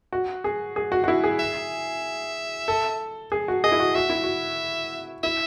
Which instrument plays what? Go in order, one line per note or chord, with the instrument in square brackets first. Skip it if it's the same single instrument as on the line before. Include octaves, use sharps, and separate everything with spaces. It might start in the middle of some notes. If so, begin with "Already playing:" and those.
[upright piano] F#4
G#4
G#4
F#4
F#4
E4
G#4
[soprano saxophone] E5
[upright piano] A4
G#4
F#4
[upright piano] G#4 [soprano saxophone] D#5
[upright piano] E4
F#4
[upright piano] F#4 [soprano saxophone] E5
[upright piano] E4
F#4
[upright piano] E4 [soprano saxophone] E5